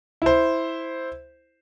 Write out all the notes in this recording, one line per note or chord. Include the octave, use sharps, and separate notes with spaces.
E4 C5